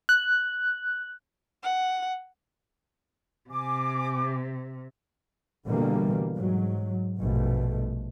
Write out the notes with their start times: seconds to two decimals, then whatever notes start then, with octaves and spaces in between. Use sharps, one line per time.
0.09 F#6
1.63 F#5
3.50 C3 G#5 D6
5.67 B2 D3 E3 G3 A#3
6.36 G#2 F#3
7.20 A#1 G2 B2 A3